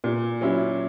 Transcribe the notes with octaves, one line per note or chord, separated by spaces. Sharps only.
A#2
F#3 C#4 E4